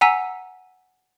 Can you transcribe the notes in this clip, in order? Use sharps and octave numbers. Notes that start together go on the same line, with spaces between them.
F#5 G#5 A#5 E6 B6 D#7